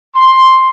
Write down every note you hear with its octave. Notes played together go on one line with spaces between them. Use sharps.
C6